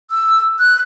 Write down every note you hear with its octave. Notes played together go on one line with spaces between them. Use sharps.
E6
F#6